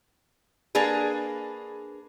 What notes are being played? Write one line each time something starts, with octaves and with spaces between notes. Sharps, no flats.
A#3 D4 G#4 B4